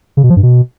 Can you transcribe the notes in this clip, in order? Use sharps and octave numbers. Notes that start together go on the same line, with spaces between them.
C#3
B2
F3
G2
B2